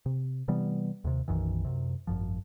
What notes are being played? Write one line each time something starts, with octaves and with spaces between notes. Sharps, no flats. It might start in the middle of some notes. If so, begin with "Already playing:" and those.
C3
C3 E3 G3 B3
D#2 C3
B1 F#2 D#3 E3
F#2 C3
G#1 F#2 F3